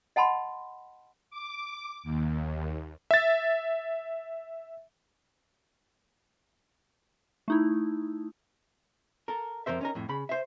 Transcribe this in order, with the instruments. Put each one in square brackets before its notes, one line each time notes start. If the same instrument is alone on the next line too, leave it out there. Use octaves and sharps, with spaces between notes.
[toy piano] D#5 F#5 A5 B5 C6
[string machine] D6
D#2
[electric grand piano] E5 A6
[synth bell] A3 D#4 E4
[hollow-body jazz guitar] A4 A#4
F2 C#3 A#4 C5 E5
C#4 D#4 A#4
F2 A2
C#3 B5
C5 E5